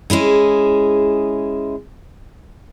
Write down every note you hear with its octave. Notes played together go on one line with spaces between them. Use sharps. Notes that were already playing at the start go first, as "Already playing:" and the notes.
G#3 C#4 E4 G#4